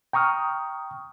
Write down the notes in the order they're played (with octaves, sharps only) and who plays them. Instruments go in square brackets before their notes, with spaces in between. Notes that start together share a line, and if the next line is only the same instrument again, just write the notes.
[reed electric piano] G5 A#5 C#6 D#6 F6